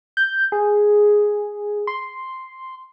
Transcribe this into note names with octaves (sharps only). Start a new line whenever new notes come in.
G6
G#4
C6